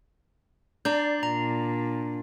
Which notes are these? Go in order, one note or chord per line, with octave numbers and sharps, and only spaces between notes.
D4 D5 A#5 G6
A#2 A#5